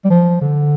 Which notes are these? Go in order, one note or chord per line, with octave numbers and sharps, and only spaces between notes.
G3
F3
D3